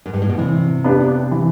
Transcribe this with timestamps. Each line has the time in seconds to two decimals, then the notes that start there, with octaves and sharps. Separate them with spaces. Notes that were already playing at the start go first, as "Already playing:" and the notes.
0.06 F#2
0.13 G2
0.22 A2
0.30 B2
0.38 C3 E3
0.84 B3 D4 G4
1.31 E3